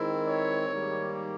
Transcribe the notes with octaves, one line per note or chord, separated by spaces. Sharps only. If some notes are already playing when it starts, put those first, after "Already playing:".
Already playing: D#3 G#3 C4 E4
C#5
G#2 D#3 G3 A#3